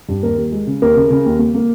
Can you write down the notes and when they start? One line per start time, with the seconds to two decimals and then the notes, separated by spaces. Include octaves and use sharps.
0.09 G2
0.23 D#2 A#4
0.38 D#2
0.52 G#3
0.67 C#3
0.82 D#2 A#4
0.96 C#3
1.10 C#3
1.26 D#2
1.39 A#3
1.54 A#3